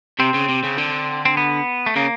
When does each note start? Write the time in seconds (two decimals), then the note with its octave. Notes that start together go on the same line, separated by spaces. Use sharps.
0.19 C3 C4
0.35 C#3
0.49 C3
0.64 C#3
0.78 D3
1.25 C4
1.37 B3
1.86 A3
1.96 C#3 A#3